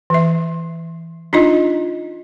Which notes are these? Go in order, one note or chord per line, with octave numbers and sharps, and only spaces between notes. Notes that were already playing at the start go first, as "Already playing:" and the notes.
E3 E5
D4 D#4 F4 D#5